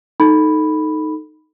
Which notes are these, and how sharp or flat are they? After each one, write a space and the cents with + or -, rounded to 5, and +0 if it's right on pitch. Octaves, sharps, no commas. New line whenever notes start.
D#4 +0 A4 +0 B5 +0